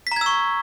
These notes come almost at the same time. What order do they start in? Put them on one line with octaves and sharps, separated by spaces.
B6 A#5 G#6 E6 C#6